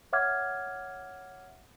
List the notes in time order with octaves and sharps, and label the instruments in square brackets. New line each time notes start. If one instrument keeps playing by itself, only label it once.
[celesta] C#5 E5 F#5 D6 F6 G#6